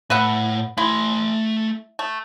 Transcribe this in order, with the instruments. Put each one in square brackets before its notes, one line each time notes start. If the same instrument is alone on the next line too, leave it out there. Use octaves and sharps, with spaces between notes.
[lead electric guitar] A2 [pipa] B4 E5 F#5
[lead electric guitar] A3 C6 [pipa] E4
[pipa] A3